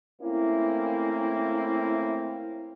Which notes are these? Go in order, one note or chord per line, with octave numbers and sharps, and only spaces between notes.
A3 A#3 C4 C#4 E4